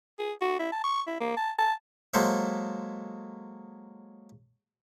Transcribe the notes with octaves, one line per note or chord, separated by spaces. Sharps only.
G#4
F#4
E4
A5
C#6
E4
A#3
A5
A5
F#3 G#3 A#3 A4 C5 E5